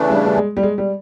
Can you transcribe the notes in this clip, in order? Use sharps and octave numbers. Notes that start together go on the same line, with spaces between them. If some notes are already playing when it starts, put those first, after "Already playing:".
Already playing: C#3 E3 A3 D4
G3
G3
G#3
G3
G#3
G3